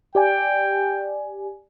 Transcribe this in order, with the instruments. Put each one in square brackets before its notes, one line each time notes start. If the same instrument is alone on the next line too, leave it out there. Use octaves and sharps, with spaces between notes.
[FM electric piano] G4 D5 G#5 [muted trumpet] G5